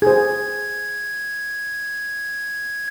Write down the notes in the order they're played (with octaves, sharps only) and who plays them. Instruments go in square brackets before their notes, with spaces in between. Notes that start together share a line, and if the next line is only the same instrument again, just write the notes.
[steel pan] G#4 C5 [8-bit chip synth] G#6